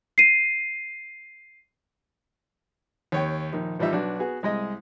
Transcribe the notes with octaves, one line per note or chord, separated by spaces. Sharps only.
C7 D#7
D#2 C#5 G5
A#1 D#3
A1 F3 G3 D#4 E5
B1 D4 F#4
B3 F#4 G#4
C2 G#3 D#5